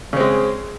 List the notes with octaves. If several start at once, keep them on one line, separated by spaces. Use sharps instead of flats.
C#3 G#3 C4